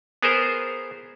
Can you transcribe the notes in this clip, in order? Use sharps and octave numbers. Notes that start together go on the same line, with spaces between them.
B3 G#4 A#4 C5